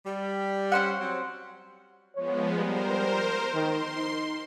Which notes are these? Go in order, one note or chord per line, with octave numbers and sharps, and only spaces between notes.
G3
C#4 C5 F#5
F#3 C4
F3 G#3 B3 C#5
G3 A#4 C5
D#3 C6
D#4